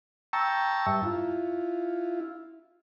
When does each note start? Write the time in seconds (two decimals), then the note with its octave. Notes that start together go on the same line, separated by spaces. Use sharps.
0.33 G5 A5 A#5 C#6 E6
0.86 G2 E5
1.03 E4 F4